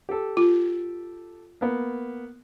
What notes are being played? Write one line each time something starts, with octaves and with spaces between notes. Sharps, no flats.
G4 A4
F4
A#3 B3